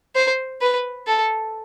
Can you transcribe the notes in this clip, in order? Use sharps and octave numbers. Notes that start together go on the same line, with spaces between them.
C5
B4
A4